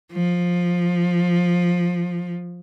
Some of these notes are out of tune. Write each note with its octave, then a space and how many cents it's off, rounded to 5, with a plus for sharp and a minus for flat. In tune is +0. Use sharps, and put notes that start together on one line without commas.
F3 +10